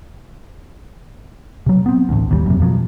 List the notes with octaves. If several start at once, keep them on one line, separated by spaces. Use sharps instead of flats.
C3 F#3
B3 C4
A1 D2
G#1 D#2 D#3 G3
F#2 C3
F2 B2 F3 F#3